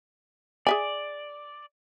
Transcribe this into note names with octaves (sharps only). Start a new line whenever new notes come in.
G#4 D5 E5 G#5